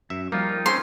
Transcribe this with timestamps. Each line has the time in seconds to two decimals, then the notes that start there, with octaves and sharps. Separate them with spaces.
0.10 F#2 E5
0.32 F3 G3 A#3 D#4 F4 A#4
0.66 C4 C#4 C5 C6